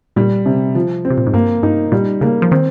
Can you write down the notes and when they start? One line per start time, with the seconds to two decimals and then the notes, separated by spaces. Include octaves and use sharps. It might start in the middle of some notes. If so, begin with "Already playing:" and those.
0.16 A#2 G3
0.46 C3
0.75 F3
1.05 C4
1.10 C3
1.18 A#2
1.27 G#2
1.33 G2 A#3
1.63 G2 D#4
1.92 A#2 G3
2.21 C#3 A#3
2.42 F3
2.51 D#3 C4